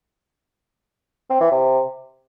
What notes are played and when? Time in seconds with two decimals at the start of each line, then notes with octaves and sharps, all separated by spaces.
1.30 C4
1.41 E3
1.51 C3